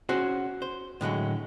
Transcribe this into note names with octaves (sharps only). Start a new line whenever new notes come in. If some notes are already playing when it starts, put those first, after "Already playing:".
C#4 F#4 G#4 C5
C5
A2 D3 F#3 G#3